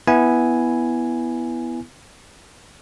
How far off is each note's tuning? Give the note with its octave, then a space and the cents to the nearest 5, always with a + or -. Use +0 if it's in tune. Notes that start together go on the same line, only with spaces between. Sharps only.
B3 +0 E4 +0 G#5 +0